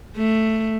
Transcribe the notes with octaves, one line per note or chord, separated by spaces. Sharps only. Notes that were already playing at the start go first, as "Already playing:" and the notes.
A3